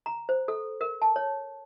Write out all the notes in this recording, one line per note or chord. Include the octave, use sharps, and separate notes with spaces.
A#5
C5
A4
A#4
A5
C#5